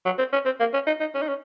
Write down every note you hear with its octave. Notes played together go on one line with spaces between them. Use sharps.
F#3
C4
C#4
C4
A#3
C#4
D#4
D#4
C#4
D#4
C#4